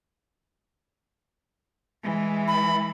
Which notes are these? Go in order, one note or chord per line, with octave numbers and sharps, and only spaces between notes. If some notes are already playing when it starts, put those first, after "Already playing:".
E3 G#3
B5